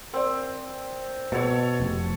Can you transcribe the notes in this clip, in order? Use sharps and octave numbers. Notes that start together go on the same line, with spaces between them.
C4 A#4 D5
B2 A4 C#5
F1